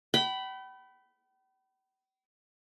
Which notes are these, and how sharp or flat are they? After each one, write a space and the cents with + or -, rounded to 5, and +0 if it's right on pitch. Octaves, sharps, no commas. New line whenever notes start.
G5 -40 B5 +5